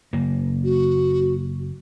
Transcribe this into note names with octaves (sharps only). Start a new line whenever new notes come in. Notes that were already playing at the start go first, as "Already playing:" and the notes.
F#1 A#3
F#4